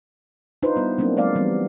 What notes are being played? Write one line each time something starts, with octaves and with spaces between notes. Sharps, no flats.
D4 D#4 F4 B4 C5
G3 B3 E4
F#3 A#3 C4 D4 E4
F#3 G#3 A#3 D#4 D5 F5
E3 G3 A3 B3 C4